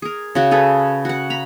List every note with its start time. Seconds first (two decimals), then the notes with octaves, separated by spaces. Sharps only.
0.02 G#4 A#4
0.35 C#3 F#4
0.51 C#4 G#4 A4 B4
1.05 F#4 F#5
1.30 A#5 B5